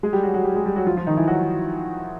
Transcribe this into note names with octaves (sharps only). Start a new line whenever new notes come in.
G#3 G#4
G3 G4
F#3 F#4
F#3 F#4
G3 G4
G#3 G#4
G3 G4
F#3 F#4
F3 F4
F3 F4
D#3 D#4
E3 E4
F#3 F#4